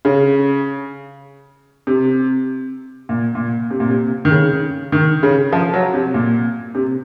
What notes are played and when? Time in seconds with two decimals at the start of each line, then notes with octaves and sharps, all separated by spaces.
0.05 C#3
1.87 C3
3.09 A#2
3.35 A#2
3.70 C3
3.80 A#2
3.90 C3
4.25 D#3
4.31 C#3
4.92 D#3
5.23 C#3
5.53 F3
5.74 F#3
5.94 C3
6.14 A#2
6.75 C3